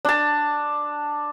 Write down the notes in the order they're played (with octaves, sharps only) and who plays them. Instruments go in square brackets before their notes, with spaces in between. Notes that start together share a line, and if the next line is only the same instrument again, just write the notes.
[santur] D4 A5